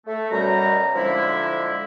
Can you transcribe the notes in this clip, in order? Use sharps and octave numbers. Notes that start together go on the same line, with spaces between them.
A3
F#2 B2 G3 A#5
D3 F3 G#3 E4